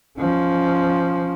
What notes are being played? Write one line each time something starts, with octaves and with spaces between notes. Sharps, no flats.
F3 C#4